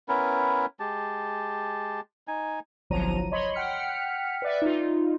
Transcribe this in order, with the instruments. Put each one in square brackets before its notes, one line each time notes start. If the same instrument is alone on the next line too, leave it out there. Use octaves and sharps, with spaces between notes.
[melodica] B3 C#4 E4 A#4
G#3 G4 A5
D#4 G#5
[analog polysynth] G1 C2 F3 F#3 A#5 D#7
C#5 D#5 B5 C6
F#5 G5 F6 B6 C#7
B4 D5 E5
D#4 F4